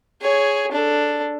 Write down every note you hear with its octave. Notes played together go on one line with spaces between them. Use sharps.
G#4 C#5
D4 A4